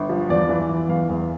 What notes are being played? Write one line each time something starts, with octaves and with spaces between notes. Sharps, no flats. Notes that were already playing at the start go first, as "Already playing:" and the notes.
Already playing: G1
F3
E2 D5
E3
E3
E2 F5
E2